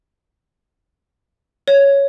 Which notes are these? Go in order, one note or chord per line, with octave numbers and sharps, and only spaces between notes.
C#5